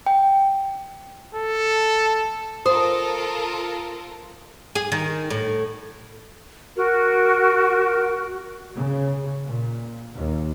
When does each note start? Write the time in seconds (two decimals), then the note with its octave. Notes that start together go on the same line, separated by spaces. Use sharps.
0.06 G5
1.34 A4
2.66 F4 A4 A#4 C5 D#6
4.75 G#4
4.92 D#3
5.30 A2
6.76 F#4 A#4
8.75 C#3
9.46 A#2
10.13 D#2